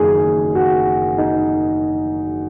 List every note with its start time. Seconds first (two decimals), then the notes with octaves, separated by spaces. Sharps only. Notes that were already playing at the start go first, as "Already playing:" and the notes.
Already playing: F#1 F#2 D#3 F#3 G#4
0.55 F#4
1.18 D#4